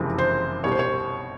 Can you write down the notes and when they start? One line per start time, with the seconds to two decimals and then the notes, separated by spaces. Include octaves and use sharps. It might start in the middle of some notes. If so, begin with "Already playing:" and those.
Already playing: F#1 F2 C3 E3 G#3
0.18 C5
0.64 C2 B2 G3 C#5
0.72 C5
0.79 C#5